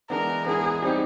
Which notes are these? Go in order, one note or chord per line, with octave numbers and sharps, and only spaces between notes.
E3 G#3 B3 D4 A#4
E3 G#3 B3 D4 G#4
G3 C4 D#4 G4